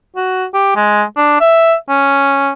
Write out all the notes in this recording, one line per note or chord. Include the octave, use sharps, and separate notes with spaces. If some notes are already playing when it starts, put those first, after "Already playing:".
F#4
G4
G#3
D4
E5
C#4